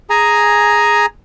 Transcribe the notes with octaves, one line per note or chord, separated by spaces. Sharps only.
G#4 G#5 A#5